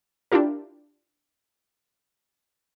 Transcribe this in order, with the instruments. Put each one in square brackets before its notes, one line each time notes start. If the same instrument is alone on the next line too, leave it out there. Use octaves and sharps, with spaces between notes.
[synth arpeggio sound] D4 E4 F4 G4 A#4